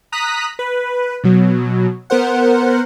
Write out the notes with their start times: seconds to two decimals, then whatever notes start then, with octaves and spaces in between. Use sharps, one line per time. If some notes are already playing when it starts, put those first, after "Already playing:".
0.12 A#5 D#6 F#6 B6
0.59 B4
1.24 B2 F#3
2.10 B3 A#4 C5 F#5